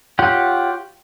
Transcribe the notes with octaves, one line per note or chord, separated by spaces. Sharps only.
F4 G4 C#5 F#5